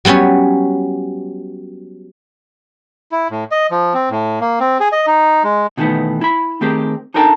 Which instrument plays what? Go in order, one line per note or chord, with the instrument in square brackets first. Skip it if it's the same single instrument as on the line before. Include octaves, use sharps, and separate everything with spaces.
[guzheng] F#3 G3 B3 C#4 C#5
[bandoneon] E4
A2
D#5
F3
C4
A2
A#3
C4
G#4
D#5
D#4
G#3
[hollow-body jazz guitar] B2 D#3 E3 A3 B3
E4 B5
D#3 A3 C4 G4 G#4 A#4
D4 D#4 A4 A#4 G5 A5